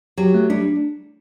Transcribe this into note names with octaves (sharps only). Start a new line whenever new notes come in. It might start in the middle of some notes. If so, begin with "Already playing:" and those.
F#3 G4
A3
G3 D4